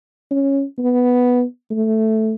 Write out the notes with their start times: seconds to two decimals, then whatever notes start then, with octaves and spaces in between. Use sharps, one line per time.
0.31 C#4
0.78 B3
1.70 A3